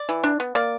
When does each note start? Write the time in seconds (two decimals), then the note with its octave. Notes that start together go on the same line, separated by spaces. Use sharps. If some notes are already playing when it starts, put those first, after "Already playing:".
Already playing: D5
0.09 E3
0.24 D4
0.40 B3
0.55 A#3 D5